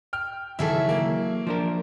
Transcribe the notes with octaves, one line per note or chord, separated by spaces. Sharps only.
G5 F6
C#2 D#3 E3 F#3 E4 G#4 A4 E5
A#3
F3 D4 A#4